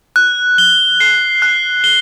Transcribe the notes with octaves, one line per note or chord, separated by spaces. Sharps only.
F#6
G7
C7
F#6
G7